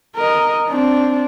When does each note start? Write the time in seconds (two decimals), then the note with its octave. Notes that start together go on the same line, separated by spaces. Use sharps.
0.16 A#4 D#5
0.69 C4 D4